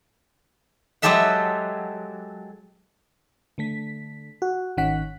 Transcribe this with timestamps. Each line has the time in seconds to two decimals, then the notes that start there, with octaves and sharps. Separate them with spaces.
1.02 F#3 G#3 G4 A4 E5 F#5
3.58 D3 A3 B6
4.42 F#4
4.77 G#1 D#3 C#4 F#5 B6